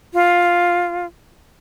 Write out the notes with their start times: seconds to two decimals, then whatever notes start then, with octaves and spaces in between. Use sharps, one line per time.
0.14 F4